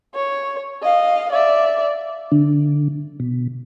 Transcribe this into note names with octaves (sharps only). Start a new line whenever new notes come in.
C#5
D#5 F5
D5 E5
D3
B2